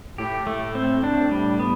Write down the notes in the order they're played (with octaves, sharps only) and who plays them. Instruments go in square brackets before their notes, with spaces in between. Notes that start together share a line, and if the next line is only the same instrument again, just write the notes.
[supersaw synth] A2 [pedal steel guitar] G4
[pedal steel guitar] A3
C4
D4
G3
B3